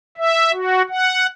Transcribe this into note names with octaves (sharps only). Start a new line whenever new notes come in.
E5
F#4
F#5